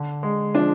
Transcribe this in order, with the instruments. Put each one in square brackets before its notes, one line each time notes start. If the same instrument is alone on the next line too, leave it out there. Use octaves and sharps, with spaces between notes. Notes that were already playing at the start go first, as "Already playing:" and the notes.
Already playing: [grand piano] D3
G#3
[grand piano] F3 [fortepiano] D4